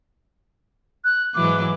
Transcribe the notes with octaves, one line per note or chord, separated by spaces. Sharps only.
F#6
G#2 E3 F#3 D6